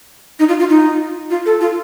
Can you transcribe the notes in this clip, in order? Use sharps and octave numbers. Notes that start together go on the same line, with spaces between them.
D#4
F4
F4
D#4
F4
A4
F4